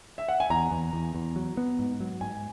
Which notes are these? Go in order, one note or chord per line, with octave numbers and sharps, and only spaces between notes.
E5
F#5
G#5
E2 A#5
E2
E2
E2
F#3
B3
G#2
F#3
G#2 G#5